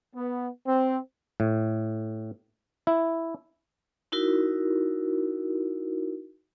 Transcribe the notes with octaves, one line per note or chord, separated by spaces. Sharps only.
B3
C4
A2
E4
D#4 E4 F#4 A#4